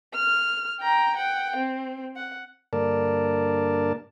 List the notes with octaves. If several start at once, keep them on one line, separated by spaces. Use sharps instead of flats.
F6
G5 A#5
F#5 G5
C4
F#5
G2 D3 A#3 A#4 D5 A5